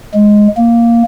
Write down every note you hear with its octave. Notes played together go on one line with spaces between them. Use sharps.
G#3
A#3